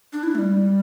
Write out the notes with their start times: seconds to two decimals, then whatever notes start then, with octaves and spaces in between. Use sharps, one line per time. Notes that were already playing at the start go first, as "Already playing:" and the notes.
0.13 D4
0.23 E4
0.35 A3
0.39 G3